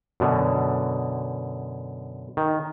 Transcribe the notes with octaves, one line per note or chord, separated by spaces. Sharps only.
F#2 B2 D3
D#3